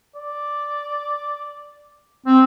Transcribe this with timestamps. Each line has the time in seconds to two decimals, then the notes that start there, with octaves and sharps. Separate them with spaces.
0.15 D5
2.26 C4 C5